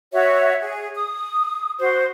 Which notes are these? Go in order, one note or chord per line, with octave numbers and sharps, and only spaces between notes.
F#4 C#5 E5
G#4
D#6
F#4 C5